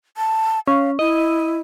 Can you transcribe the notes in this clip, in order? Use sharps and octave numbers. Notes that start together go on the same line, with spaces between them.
A5
C#4 F5
E4 D#5